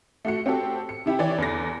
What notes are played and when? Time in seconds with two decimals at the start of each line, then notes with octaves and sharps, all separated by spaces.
0.25 A3 F#4 C#7
0.46 C4 F#4 G4 A4
0.89 C#7
1.06 C3 E4 G4
1.19 E3 C#5 D5
1.38 E2 D3 A#6